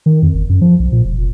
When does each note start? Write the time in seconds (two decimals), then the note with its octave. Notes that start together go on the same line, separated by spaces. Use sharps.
0.06 D#3
0.22 F2
0.34 G1
0.49 F#2
0.61 F3
0.79 B1
0.92 A#2
1.05 E1
1.18 F1